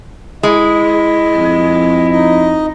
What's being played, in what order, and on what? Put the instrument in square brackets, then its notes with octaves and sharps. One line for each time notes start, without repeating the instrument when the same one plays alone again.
[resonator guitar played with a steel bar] G#3 [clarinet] E4 [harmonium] D#5
[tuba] F2
[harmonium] D#4 D#5